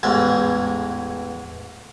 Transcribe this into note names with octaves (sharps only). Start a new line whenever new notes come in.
A1 E2 G#2 E5